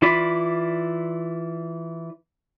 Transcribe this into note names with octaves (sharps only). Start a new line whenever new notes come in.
E3 E4 F4 D5 B5